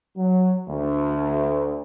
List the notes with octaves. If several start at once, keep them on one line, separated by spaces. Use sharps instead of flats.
F#3
D2